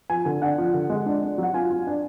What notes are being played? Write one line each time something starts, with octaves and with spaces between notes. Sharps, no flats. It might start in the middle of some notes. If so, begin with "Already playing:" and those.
F3 G#5
D3 G#5
D4 F#5
F3
D3
G#3
D4
D4
F#3 F#5
F4 G#5
F4
D4